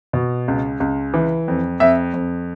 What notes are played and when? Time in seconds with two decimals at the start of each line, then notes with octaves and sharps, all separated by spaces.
0.13 B2
0.48 C#2
0.80 C#2
1.14 E3
1.48 F2
1.80 F2 E5
2.14 F2